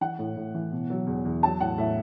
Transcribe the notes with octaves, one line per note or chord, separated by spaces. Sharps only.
E3 F#5
A2
A2
E3
B2
F#3
E2
E2
F#3 A5
A2 F#5
A2 E5